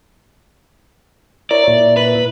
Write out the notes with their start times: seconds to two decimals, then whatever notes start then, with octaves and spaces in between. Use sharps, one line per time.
1.51 E4 A#4 C#5 D5
1.67 A#2 E4
1.97 B4